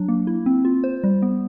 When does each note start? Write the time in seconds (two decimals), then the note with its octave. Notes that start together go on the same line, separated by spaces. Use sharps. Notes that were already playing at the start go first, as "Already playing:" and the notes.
Already playing: F#3 D4
0.09 A#3
0.27 E4
0.46 C4
0.65 F4
0.84 C5
1.04 G3
1.22 B3